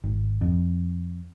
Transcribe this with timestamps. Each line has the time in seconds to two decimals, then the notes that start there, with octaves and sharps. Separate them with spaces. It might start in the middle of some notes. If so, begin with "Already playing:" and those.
0.04 G#1
0.41 F2